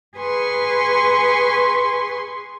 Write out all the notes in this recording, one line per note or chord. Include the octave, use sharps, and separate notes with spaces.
G#4 B4 G#5 C6 C#6